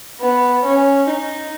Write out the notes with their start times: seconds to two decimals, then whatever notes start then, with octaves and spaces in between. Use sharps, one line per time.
0.20 B3
0.65 C#4
1.09 D#4